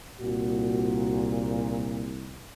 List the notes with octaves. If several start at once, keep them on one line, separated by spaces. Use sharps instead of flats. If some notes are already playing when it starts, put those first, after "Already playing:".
C2 A#2 F#4